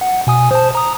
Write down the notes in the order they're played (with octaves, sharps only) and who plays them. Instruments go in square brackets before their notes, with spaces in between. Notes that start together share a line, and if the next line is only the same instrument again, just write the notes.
[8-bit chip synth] F#5
B2 G#5 D#6
C5 A5
A#5 D#6